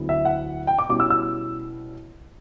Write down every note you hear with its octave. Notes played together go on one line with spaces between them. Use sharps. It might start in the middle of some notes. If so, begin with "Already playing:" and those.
Already playing: D2 D3 F#3 B3 E4
E5
F#5
G5
D6
B2 G3 C#4 E4 D6
E6
E6